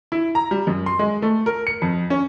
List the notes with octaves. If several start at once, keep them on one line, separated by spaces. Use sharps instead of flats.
E4
A#5
G3
F#2
C6
G#3
A3
A#4
C#7
F2
C#4